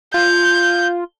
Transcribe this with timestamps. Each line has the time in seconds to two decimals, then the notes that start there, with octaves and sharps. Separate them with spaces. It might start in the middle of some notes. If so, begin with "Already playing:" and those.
0.14 F4 G6